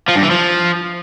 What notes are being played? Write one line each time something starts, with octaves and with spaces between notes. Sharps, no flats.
F3
G2
E3
F3